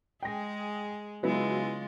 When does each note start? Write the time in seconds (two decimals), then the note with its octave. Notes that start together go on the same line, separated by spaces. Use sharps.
0.23 G#3 G#4 G5 A#6
1.23 C#3 F#3 G#3 B3 E4 F4